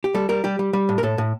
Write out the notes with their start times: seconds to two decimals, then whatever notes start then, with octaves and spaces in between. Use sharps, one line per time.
0.04 G4
0.15 G3 A4
0.29 G3 A#4
0.44 G3 G4
0.59 G3
0.73 G3
0.89 A2
0.98 A#4
1.03 A2 A4
1.18 A2